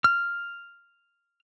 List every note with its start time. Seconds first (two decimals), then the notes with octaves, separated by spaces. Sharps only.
0.04 F6